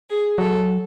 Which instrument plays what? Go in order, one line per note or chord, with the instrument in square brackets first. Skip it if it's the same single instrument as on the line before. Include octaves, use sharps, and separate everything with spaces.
[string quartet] G#4
[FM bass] F#3 [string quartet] A4